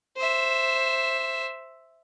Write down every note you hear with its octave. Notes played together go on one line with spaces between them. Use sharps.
C5 E5